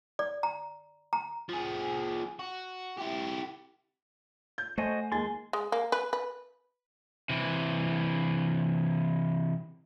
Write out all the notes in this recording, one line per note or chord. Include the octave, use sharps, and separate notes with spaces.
D5
A#5
A#5
F3 G#4
F#4
E4 G4
G6
A3 F#4 C5 D#5 G#5
D#2 G#3 G#5 C6 A6
G#3
A#3
B4
B4
C3 E3